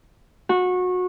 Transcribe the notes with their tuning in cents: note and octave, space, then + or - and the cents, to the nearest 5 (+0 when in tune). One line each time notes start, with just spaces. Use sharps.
F#4 -25